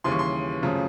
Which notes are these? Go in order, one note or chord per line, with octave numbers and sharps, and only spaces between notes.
D#2 C#3 E3 G3 C6
C#6
C6
G#1 F#2 C#3 F3 A3